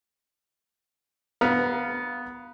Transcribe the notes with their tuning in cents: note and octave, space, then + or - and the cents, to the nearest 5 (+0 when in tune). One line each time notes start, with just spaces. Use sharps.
B3 +0 F5 +0 A#5 +40